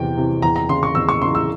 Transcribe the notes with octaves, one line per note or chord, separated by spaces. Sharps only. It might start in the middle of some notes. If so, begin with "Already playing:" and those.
Already playing: E2 C3 E3 G5
C3 E3
E2 A#5
A#5
C#3 E3 C6
C#6
E2 E6
C#6
C#3 E3 C6
E6